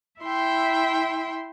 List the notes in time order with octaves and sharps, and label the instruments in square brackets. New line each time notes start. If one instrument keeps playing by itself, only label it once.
[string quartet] E4 E5 G5 C6